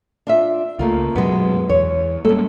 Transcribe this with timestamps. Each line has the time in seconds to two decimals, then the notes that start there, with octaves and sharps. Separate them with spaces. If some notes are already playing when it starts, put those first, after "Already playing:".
0.27 D4 F4 E5
0.79 C#2 A3 A#3 F4
1.15 F#2 B2 F#3 G#3 B3
1.69 E2 C#5
2.25 G3 G#3 A#3 C#4 A4